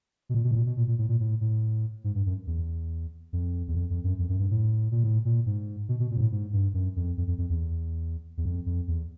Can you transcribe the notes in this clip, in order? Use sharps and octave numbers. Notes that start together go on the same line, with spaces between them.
B2
A#2
B2
A2
A#2
B2
A#2
A#2
A2
A#2
A2
A2
G#2
G2
F#2
E2
F2
E2
F2
F2
F#2
F2
F#2
G2
A2
A#2
A2
A#2
G#2
B2
B2
A#2
G#2
A2
G#2
G2
F#2
F2
F2
F2
F2
E2
E2
F2
F2
E2